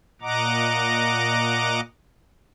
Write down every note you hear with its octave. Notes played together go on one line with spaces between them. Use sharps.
A#2 D#5 F#5 A#5 D6